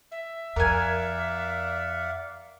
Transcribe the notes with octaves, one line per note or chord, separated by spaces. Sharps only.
E5
F2 A#4 D5 F5 F#5 G#5